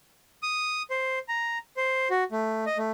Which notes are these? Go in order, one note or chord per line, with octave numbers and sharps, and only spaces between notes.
D#6
C5
A#5
C5
F#4
A3
D#5
A3